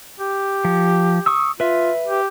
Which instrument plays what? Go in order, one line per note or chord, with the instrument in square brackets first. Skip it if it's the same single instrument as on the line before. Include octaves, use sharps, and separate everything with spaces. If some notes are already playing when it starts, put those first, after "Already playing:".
[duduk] G4
[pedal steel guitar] F3
C#6 D#6 E6
[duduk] F4 [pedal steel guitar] B4 E5
[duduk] G4